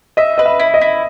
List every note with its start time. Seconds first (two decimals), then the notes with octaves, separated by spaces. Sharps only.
0.17 D#5 E5
0.38 B4 D#5
0.46 E5
0.60 E4
0.74 D#5
0.81 E4